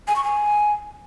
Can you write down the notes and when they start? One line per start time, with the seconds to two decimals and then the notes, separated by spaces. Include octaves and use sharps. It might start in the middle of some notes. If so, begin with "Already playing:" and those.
0.08 G#5
0.16 C#6
0.24 G#5